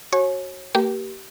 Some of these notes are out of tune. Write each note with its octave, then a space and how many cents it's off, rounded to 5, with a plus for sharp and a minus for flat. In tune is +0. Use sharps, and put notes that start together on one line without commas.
F#4 +5 C#5 -30 G#5 +35
A#3 -45 G4 -20 A#4 +40